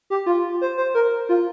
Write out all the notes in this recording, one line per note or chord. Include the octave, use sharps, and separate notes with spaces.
G4
F4
C5
C5
A#4
F4